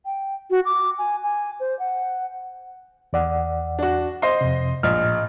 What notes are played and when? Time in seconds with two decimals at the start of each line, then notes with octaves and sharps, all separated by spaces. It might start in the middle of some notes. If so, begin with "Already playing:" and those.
0.05 G5
0.51 F#4
0.65 D6
0.98 G#5
1.23 G#5
1.60 C5
1.79 F#5
3.13 E2 D5 F#5
3.79 D4 F#4
4.22 C5 D#5 C6
4.41 F2 C3
4.83 A#1 A2 D#5 F6